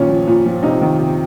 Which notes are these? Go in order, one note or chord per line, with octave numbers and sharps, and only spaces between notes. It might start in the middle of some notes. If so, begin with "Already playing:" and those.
Already playing: A#2 D#3 C#4
F3
A#2
F3
C3 D#4
D#3
C3